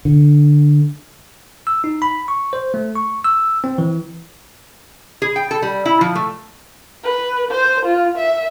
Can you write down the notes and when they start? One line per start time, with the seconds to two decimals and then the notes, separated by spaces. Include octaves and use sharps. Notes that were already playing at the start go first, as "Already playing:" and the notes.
0.05 D3
1.67 E6
1.84 D#4
2.02 B5
2.28 C#6
2.53 C5
2.74 A3
2.96 C#6
3.24 E6
3.64 C4
3.78 E3
5.22 G#4
5.36 G5
5.51 A4
5.62 G3
5.85 E4
6.01 F3
6.15 A3
7.04 B4
7.51 C5
7.86 F4
8.18 E5